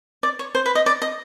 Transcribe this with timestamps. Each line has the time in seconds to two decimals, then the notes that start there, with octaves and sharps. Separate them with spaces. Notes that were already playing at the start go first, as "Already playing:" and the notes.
0.23 D5
0.39 C#5
0.55 C5
0.66 B4
0.75 D#5
0.86 D5
1.02 D#5